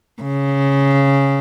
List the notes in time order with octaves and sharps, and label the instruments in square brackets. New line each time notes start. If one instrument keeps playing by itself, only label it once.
[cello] C#3